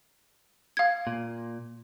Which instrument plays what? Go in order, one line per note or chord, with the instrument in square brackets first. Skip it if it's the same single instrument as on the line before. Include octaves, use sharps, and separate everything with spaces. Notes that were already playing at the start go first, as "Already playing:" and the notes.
[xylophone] F5 G#6
[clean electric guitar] A#2